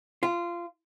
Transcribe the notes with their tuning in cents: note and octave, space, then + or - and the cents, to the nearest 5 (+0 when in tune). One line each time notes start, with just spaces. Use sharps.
F4 -20